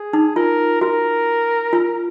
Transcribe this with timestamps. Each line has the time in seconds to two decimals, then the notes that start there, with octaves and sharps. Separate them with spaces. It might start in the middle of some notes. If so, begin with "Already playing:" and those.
Already playing: G#4
0.13 D#4
0.36 F4 A#4
0.81 F#4 A#4
1.73 F4